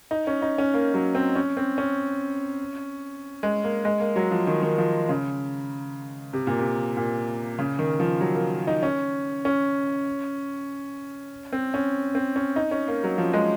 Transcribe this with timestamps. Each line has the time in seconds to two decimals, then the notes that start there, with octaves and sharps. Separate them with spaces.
0.11 D#4
0.27 C#4
0.42 D#4
0.58 C#4
0.74 A#3
0.94 F#3
1.15 C4
1.35 C#4
1.57 C4
1.78 C#4
3.43 G#3
3.64 A#3
3.85 G#3
4.00 A#3
4.16 F#3
4.31 F3
4.47 D#3
4.63 D#3
4.78 F3
5.09 C#3
6.33 C3
6.47 A#2
6.59 C3
6.97 A#2
7.59 C#3
7.79 D#3
8.00 F3
8.21 F#3
8.36 A#3
8.67 D#4
8.83 C#4
9.45 C#4
11.52 C4
11.74 C#4
12.15 C4
12.36 C#4
12.56 D#4
12.71 C#4
12.88 A#3
13.04 F#3
13.18 F3
13.33 G#3